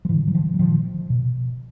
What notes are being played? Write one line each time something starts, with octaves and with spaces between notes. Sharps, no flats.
F3
A2 D3 E3
F#3
D#3 F3
F#3
A#2 D#3 F3
B2